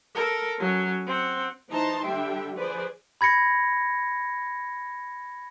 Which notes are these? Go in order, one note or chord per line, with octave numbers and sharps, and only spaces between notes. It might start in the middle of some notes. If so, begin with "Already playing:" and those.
A4 A#4
F#3 C#4
C4 F#5
E3 D#4 C5 A5 A#5 C6
D3 G3 D4 E5 G5
F3 G#4 B4 C5 D5
B5 G#6 A#6 C#7